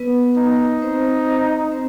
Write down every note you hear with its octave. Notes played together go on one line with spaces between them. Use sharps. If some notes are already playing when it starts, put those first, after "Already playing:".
Already playing: B3 B4
D#4
C4 C5
C4 C5